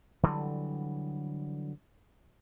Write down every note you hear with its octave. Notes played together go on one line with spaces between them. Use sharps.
D3 E3 F#3 G3